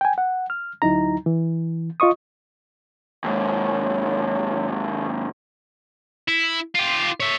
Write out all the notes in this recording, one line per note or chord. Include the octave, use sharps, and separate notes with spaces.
G5 G#5
F#5
F6
D2 F#3 D#4 E4 A#5
E3
F4 D#5 C#6 D#6
D#2 G#2 C#5
E4
F4 G4
C#5 E5